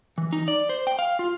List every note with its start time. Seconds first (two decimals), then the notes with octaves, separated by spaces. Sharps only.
0.18 E3
0.32 D#4
0.48 D5
0.69 C5
0.87 G5
0.99 F5
1.19 F4